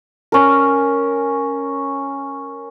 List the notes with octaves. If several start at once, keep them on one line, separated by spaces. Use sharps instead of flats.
C#4 A#4